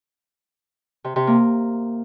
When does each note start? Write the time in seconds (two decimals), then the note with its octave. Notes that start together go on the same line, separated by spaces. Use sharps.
1.04 C3
1.16 C3
1.27 A#3